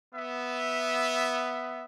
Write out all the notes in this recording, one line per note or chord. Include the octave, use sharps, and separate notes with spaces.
B3 E5